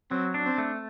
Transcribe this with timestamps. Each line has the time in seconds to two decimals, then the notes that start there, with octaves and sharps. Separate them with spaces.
0.11 F#3 C4
0.34 D4
0.46 C4
0.58 A3